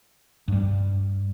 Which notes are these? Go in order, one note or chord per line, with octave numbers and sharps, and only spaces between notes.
G2 G3